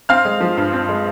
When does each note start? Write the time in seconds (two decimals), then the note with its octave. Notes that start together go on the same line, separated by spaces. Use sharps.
0.09 C4 F5 F6
0.25 G#3
0.40 F3
0.57 G2
0.73 C4
0.89 G#3